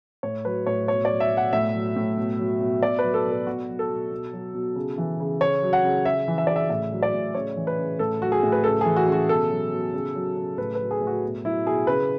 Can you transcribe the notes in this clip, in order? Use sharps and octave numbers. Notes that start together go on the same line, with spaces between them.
A2 C#5
F#3 B4
A2 C#5
B2 C#5
D5
F#3
E5
B2
F#5
A2 E5
F#3
A2
B2
F#3
B2
B2 D5
B4
F#3
A4
B2
A4
B2 F#4
F#3
A4
B2
B2
F#3
B2
C#3
E3
C#3
C#3 C#5
F#3
F#5
C#3
C#3 E5
E3
E5
C#3 D5
E5
A2 E5
F#3
D5
A2
C#3 C#5
E3
B4
C#3
A2 A4
F#3 F#4
G#4
A2
B4
C#3 A4
E3 G#4
F#4
C#3
F#4
B2 A4
F#3
B2
C#3
F#3
C#3
A2 B4
B4
F#3
G#4
A2
F#4
B2
F#3 E4
B2 G#4
C#3 B4